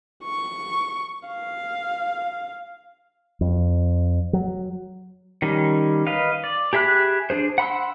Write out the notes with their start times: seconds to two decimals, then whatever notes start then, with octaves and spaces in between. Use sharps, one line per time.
0.25 C#6
1.28 F5
3.41 F2
4.33 F#3
5.42 D#3 G3 C#4
6.07 B4 D#5 F5
6.44 D5
6.73 G4 G#4 E5 B5 F#6
7.30 D4 G#4 C5
7.58 F#5 B5 C6 E6